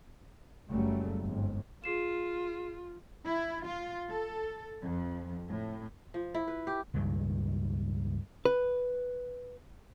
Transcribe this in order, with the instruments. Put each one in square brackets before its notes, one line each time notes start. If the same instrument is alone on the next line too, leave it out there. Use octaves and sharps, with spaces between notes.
[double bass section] F#1 C#3 F#3 G3 A3
G1 F2 G#2
[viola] F4 [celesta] G#4 C7 E7
[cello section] E4
F4
A4
F2
A2
[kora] F3
E4
B4
G4
[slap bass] C#2 G2 A#2 D#3
[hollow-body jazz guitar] B4